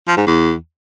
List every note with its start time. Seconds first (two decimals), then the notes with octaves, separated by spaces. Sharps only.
0.08 F3
0.17 G#2
0.27 E2